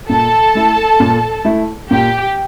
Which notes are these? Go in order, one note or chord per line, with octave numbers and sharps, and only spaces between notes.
A#2 A4 A5
A3 E4
A#2
A3 E4
A#2 G4 G5